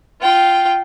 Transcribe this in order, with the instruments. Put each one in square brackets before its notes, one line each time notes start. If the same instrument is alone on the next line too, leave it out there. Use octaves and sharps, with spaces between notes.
[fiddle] F4 G5